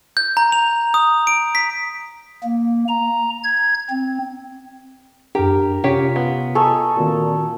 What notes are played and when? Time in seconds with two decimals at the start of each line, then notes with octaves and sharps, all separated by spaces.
0.17 G6
0.37 A#5
0.52 F7
0.94 D#6
1.27 D7
1.55 B6
2.43 A#3
2.88 A#5
3.43 G#6
3.90 C4
5.35 F#2 D4 G4 A#4
5.84 C3 C#4 F4 G4 B6
6.16 B3
6.55 A4 C#5 D#5 G#5 A#5 D#6
6.97 A#2 D#3 C4 F#4